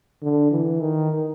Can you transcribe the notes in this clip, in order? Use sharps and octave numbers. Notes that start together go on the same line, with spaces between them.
D3
E3
D#3